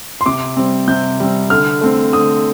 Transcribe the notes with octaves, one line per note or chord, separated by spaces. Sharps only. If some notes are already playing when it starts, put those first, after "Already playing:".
C6
C3 D6
G3 C4
C3 G6
G3 C4
D3 F6
A3 C4
D3 D#6